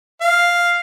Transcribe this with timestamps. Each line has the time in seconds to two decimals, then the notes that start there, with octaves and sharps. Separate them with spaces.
0.21 F5